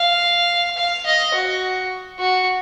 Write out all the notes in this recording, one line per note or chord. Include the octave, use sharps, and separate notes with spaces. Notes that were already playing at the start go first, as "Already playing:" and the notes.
Already playing: F5
F5
D#5
F#4
F#4